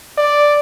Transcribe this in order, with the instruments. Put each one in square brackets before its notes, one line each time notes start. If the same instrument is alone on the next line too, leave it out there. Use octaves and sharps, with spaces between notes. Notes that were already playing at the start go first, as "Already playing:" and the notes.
[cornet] D5